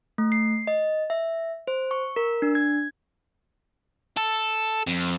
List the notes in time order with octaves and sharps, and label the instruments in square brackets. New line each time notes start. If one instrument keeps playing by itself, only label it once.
[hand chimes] A3
C7
D#5
E5
C5
C#6
A#4
D4
G#6
[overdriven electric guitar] A4
F2